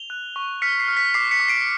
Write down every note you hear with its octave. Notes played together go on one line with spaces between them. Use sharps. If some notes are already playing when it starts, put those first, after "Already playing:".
Already playing: F7 G7
F#6
C#6
F6 B6 C#7
C7
F6
B6
D6 C7
B6 C#7
D6
C7 D7